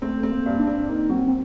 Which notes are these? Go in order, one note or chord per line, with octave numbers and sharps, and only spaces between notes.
A3 C4
C4
A#3
G2
D4
C4
A#3 D#4
F#3 C4
C4